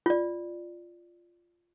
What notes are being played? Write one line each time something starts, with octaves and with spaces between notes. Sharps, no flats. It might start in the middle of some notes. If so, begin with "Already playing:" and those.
F4 D5